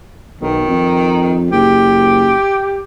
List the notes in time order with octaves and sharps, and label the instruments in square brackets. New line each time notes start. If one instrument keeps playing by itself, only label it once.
[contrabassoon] B1 [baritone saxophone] D#3
[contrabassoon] F2
[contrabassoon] F#1 [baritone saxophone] G4